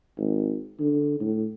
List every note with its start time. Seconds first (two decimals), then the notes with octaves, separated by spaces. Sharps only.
0.18 G#1
0.79 D3
1.20 A2